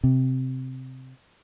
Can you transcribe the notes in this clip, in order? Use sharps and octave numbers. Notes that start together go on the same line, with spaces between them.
C3